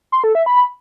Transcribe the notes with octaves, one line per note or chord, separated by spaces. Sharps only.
C6
A4
E5
B5